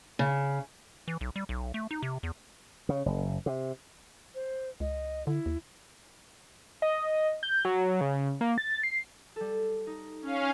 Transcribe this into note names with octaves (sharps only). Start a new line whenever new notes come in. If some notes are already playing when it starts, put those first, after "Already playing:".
C#3
E3
B1
G3
B1
A3
D#4
C3
E2
C#3
F#1
C3
C5
C#2 D#5
D3 E4
D#2
D#5
G6
F#3
C#3
A#3
A6
C7
G3 A4
D#4
C#4 F5